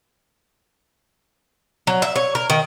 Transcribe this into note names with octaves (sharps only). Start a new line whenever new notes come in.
F#3
E5
C#5
A#4
D#3